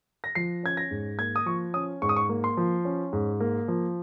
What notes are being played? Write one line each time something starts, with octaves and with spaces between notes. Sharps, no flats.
A#6
F3 C7
C#4 G#6
A#6
G#2
A#3 G#6
D#6
F3 C#6
C#4 D#6
G#2 C#6
D#6
C#6
A#3
C6
F3
C#4
G#2
A#3
F3